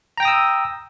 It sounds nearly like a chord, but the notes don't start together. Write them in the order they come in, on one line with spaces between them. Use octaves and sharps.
A#5 G5 A#6 D#6 E6